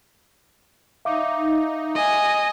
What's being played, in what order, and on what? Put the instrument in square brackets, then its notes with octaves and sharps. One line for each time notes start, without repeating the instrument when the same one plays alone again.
[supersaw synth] D#4 [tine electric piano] E5 F5 D6
[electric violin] D#5 G#5